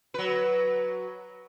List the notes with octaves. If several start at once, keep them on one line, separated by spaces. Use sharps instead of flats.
F#3 B4